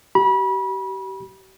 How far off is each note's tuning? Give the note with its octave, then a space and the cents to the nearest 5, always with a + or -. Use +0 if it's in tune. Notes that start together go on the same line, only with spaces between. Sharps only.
G4 -35 B5 -30